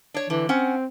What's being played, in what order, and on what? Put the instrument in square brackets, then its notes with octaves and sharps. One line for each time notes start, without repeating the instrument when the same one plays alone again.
[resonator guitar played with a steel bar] D4 C#5
[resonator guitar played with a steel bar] D3 [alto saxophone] E3
[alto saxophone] C4 [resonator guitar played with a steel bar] C#4 F#5